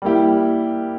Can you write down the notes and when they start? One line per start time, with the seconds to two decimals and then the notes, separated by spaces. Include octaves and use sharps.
0.02 G3 A#3 E4 G4